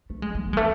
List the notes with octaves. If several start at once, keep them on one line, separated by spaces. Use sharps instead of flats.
A3
G#3
A3
B3
G#3
A3